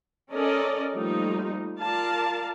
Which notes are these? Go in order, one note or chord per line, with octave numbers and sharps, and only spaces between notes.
C#4 A4 A#4 D5 D#5
F3 G3 A3 A#3 D#4
F4 A#4 D5 F5 A5